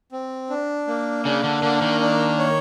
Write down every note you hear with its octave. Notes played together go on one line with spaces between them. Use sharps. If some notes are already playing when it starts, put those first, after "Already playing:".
C4
D4
A#3
C#3 D4
D3
D3 A#3
D#3
D4
C#5